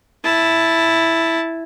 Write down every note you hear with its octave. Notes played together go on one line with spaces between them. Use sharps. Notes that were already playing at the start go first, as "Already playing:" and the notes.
E4 A5